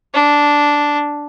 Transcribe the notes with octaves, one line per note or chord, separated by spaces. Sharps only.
D4